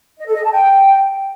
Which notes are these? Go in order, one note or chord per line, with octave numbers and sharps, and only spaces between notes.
D#5
A4
D#5
A5
G5